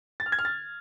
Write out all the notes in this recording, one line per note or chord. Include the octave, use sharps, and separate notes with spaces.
A6
F6
G#6
F6
A6